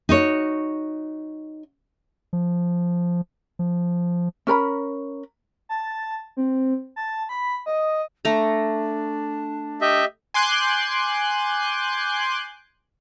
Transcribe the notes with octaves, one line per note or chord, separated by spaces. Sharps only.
D#4 F#4 C#5
F3
F3
C#4 A#4 A#5 B5
A5
C4
A5
B5
D#5
A3 D4 A#5
G4 D#5 E5
G#5 C6 D6 F#6 G6